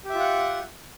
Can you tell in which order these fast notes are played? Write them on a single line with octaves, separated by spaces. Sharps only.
G4 E5 F4 F#5